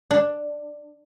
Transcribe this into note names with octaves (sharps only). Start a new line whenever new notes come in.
D4